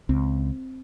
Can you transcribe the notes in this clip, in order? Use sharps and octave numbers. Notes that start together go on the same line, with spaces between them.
C#2 C4